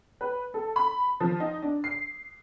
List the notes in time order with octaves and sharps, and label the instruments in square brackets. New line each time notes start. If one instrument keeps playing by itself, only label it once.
[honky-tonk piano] B4
A4
B5
F3
D#4
D4
C7